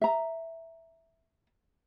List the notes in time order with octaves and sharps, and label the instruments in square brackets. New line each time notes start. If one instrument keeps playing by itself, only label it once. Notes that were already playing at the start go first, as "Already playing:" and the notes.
[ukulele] E5 A#5